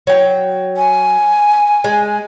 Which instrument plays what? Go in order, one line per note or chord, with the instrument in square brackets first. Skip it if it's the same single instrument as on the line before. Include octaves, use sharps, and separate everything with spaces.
[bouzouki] F#3 G5
[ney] G#5
[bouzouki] G#3